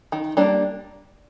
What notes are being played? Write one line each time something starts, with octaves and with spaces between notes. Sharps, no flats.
D#3
G3 A#3 D4